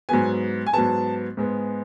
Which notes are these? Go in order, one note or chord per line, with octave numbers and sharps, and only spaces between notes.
G#2 F#3 B3 G#5
G#5
G#2 F#3 B3 A5
G#2 G#3 B3